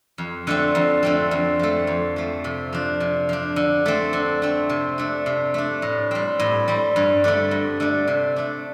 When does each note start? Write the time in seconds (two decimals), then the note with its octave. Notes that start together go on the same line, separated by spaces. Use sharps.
0.18 F2
0.47 D3 A3 C4
0.75 F2
1.03 D3 A3 C4
1.31 F2
1.59 F3 A3
1.87 F2
2.16 F3 A3
2.44 C3
2.73 F3 D4
3.00 C3
3.29 F3 D4
3.56 D3
3.86 A3 C4
4.13 D3
4.42 A3 C4
4.69 C3
4.98 A3 D4
5.26 C3
5.54 A3 D4
5.82 A2
6.11 G3 C4
6.40 A2
6.68 G3 C4
6.96 G2
7.24 D3 A3 D4
7.51 G2
7.80 D3 A3 D4
8.08 C3
8.36 A3 D4